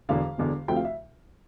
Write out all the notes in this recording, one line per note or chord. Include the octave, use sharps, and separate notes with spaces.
E1 E2 D3 F5
E1 E2 D3
D2 C3 F3 A3 G5
F5
E5